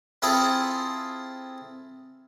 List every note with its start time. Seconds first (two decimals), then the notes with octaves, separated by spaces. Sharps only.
0.22 C4 E4 F4 G#4 A4